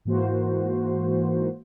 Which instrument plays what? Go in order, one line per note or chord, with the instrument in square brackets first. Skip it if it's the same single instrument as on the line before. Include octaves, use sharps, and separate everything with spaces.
[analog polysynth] G#2 E3 A#3 F#4 C5